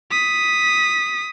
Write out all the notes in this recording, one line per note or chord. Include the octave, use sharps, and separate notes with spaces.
D#6 B6